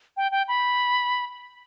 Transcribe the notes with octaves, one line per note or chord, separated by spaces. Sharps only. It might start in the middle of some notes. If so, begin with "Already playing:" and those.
G5
G5
B5